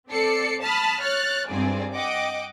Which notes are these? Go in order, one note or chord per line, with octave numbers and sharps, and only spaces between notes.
C4 A4 D5 C7 C#7
A5 B5 D#6 F6
C#5 F6 F#6 A6
G#1 G2 C4 G#4 D5
D#5 F#5 G5 D6